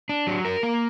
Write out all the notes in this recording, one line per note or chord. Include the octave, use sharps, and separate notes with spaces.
D4
F#3
A#4
A#3